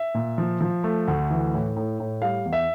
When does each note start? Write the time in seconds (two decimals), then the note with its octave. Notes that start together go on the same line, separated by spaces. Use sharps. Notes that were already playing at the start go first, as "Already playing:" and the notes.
Already playing: E5
0.14 A#2
0.38 F3
0.61 F3
0.84 A3
1.08 D2
1.30 E3
1.53 A2
1.76 A2
2.00 A2
2.22 G3 F5
2.45 E2
2.53 E5